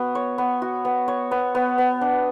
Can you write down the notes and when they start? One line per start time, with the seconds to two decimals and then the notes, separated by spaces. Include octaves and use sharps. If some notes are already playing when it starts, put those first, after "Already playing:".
Already playing: B3 F#4
0.15 C#5
0.38 B3
0.62 F#4
0.85 B3
1.08 C#5
1.31 B3
1.55 B3
1.78 B3
2.01 D4